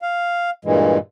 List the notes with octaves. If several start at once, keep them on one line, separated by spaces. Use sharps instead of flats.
F5
G2 A#2 E3 G#3